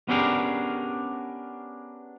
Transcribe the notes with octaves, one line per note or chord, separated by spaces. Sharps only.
B3 C#4 D4 G4 G#4 A#4